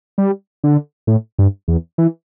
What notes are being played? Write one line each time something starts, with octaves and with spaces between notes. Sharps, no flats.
G3
D3
A2
G2
E2
E3